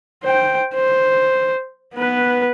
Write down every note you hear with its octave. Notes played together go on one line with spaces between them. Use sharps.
C5 G5
C5
B3 B4